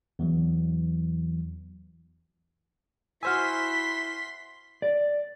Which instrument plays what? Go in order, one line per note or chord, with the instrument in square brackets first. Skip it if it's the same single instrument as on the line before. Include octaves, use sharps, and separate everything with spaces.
[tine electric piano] E2 E3 F#3
[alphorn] E4 [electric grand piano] F#4 C5 G#5 [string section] C6 B6 [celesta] E6 F6
[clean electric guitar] D5